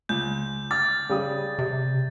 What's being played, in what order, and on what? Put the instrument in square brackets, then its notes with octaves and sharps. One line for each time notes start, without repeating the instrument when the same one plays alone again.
[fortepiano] C#2 [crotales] G6
[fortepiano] D6 F6 [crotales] A6
[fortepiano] C#3 G3 D#6
[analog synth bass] C3